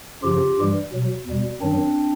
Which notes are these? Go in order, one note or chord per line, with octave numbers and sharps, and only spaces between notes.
F#2 C#3 F3 F4 G4
G2 E3 G3
B2 F#3
E2 B2 G3
F#2 D#3 F#3 C4 D4